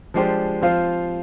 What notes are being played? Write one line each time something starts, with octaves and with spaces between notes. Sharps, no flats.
F3 G#3 D4 G4 C5
F3 C4 F4 C5 F5